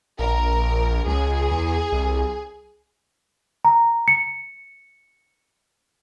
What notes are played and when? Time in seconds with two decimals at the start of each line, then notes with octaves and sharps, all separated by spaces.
0.19 A#1 A#4
1.06 C#2 G#4
1.51 E2
1.92 C2
3.65 A#5
4.08 C#7